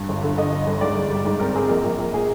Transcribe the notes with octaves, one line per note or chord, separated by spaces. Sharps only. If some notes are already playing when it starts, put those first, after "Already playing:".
Already playing: G2
G1
D3
D3 D#5
G1
G1
G#2 D5
G#2
G3
G#2
C4 A#4
C4 G#4
A#1 A#4
A#1
A#1
A#2 G#4